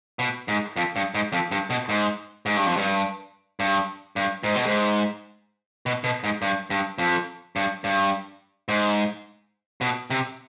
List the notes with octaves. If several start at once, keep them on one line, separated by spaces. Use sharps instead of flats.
B2
G#2
F2
G2
G#2
F2
G2
B2
G#2
G#2
G2
F2
G2
G2
G2
G#2
B2
G#2
B2
B2
G#2
G2
G2
F2
G2
G2
G#2
B2
C3